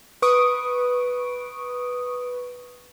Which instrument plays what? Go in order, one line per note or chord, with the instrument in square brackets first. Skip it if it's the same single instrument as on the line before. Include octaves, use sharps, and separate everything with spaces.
[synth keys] B4 C#6 D#6 D7